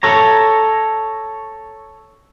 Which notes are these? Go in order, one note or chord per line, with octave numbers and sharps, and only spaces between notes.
A4 C#5 A#5